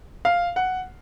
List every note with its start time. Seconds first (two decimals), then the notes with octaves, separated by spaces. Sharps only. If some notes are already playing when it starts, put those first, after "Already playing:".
0.25 F5
0.56 F#5